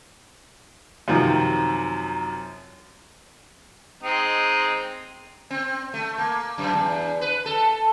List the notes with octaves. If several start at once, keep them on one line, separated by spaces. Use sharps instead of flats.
F#2 C3 D#3 F3
G#3 C4 D#4
C4
A3
A#3
F#2
E2
B4
A4